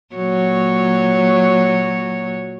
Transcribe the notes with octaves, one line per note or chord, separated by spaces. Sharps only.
A#2 F#3 C#5